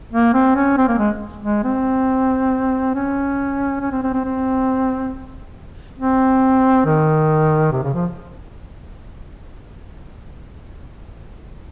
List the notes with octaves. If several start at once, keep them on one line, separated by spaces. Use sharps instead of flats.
A#3
C4
C#4
C4
A#3
G#3
G#3
C4
C#4
C#4
C4
C4
C4
C4
C4
D#3
C3
C#3
F3